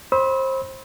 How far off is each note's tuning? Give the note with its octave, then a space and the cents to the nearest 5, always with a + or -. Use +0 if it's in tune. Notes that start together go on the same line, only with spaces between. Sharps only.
C5 +25 B5 +0 E6 -35